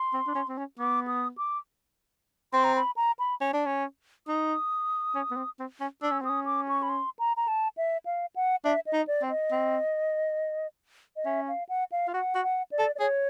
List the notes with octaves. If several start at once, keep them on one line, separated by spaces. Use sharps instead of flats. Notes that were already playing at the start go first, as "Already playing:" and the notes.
Already playing: C6
C4
D4
C#4
C4
C#4
B3 D6
D#6
D6
C4 C6
A#5
B5
A#5
B5
C#4
D4
C#4
D#4 D#6
C#4
B3
C4
C4
C#4
D4 E6
C#4
C4 D#6
C#4
D6
C#6
B5
C6
A#5
A#5
A5
E5
F5
F#5
D4 E5
D#5
D#4
D5
C4
D#5
C4
D#5
C#4 E5
F5
F#5
F5
F4
F#4 F#5
F#4
F#5
D5
A4
D5
G#4 C#5